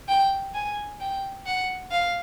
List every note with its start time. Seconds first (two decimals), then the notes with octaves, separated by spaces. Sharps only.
0.08 G5
0.54 G#5
1.00 G5
1.46 F#5
1.91 F5